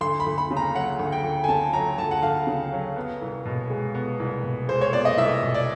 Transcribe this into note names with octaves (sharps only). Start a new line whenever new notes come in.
D2 C6
B5
D2
B5
C#3
A#5
F#3 F#5
D2
G5
D2
G#5
C#3 A5
F#3 A#5
D2 A5
F#5
D2 F5
C#3
F#3
B3
C2
B2
G#3
B3
C2
B2
G#3 C5
C#5
B3 D5
D#5
C2 E5
B2
D5